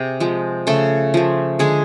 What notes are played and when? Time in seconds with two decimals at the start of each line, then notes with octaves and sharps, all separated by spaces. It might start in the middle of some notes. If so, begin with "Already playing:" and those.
Already playing: C3 G#4
0.20 F3 G#3
0.67 C#3 A3 A4
1.14 F3 A3
1.59 D3 G#3 G#4